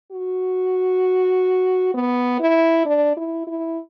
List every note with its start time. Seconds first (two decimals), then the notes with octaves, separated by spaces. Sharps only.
0.12 F#4
1.95 B3
2.40 E4
2.86 D4
3.17 E4
3.47 E4